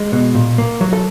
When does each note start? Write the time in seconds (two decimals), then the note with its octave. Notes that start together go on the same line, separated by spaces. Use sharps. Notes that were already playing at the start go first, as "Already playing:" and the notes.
Already playing: G#3
0.12 B2
0.35 A#2
0.58 A#3
0.81 F#3
0.93 A4